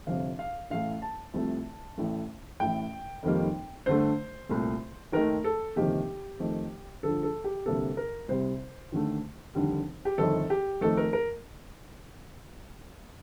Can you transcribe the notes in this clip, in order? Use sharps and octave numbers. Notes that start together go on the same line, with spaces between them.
G1 F2 C3 F5
F5
A1 A2 A3 F5
A5
C2 C3 F3 A3
A1 A2 A3
A1 A2 A3 G5
F1 F2 D#3 G3 A#3
G2 D3 A3 C5
C2 A#2 A3
D#2 D#3 A3 A#4
A4
G1 F2 C3 D#3 A#3 G4
F2 D#3 A3
G2 D3 F3 A4
A4
G4
D2 C3 G3 A#3 A4
A#4
C2 C3 G3 C5
D#2 D3 A3
F1 D#2 D3 G3
G4
G1 F2 D#3 A4
G4
F2 D#3 A3 A4
A#4
A#4